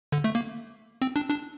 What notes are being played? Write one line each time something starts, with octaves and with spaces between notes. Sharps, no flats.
D3
A3
A#3
C4
D4
D4